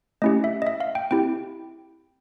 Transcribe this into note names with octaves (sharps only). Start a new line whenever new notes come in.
A3 C#4 E4 G4 D#5
E5
D#5
E5
F5
G5
C4 E4 G4 G5